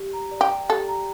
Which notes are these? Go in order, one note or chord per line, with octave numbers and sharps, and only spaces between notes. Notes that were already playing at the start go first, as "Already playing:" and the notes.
Already playing: G4
A#5
D5
G4
G5
G4 A4
A#5